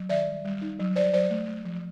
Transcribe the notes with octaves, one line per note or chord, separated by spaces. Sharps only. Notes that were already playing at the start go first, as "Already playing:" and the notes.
Already playing: F#3
D#3 D5 E5
G3
G3
D#4
F#3
F#3 C5 D5
F#3 C5 D5
A3
A3
F3